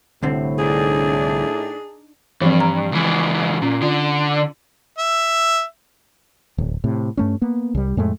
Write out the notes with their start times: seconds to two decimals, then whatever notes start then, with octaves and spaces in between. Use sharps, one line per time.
0.23 C2 A2 D3 C4
0.59 D4 D#4 G#4
2.41 G2 E3 F3 C4
2.60 A#5
2.92 C#2 E3
3.62 A#2 C#4
3.82 D3 F4
4.98 E5
6.58 D1
6.84 A2 C3
7.17 G2 A3 C#4
7.42 A#3 B3
7.75 C2 G3
7.97 F2 A2 G#3 A3